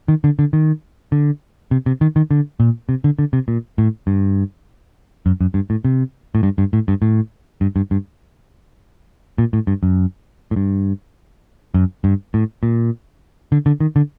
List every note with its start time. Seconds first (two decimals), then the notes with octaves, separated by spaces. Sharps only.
0.08 D#3
0.24 D3
0.39 D3
0.53 D#3
1.12 D3
1.71 C3
1.86 C3
2.01 D#3
2.16 D#3
2.31 D3
2.60 A#2
2.89 C3
3.04 D3
3.19 D3
3.33 C3
3.48 A#2
3.78 A2
4.07 G2
5.26 F#2
5.41 F#2
5.54 G2
5.70 A2
5.85 C3
6.35 A2
6.43 G2
6.58 G2
6.73 A2
6.88 G2
7.02 A2
7.61 G2
7.76 G2
7.91 G2
9.38 A#2
9.53 A2
9.67 G2
9.83 F#2
10.51 A2
10.56 G2
11.74 F#2
12.04 G2
12.34 A2
12.63 A#2
13.52 D3
13.66 D3
13.80 D#3
13.96 D3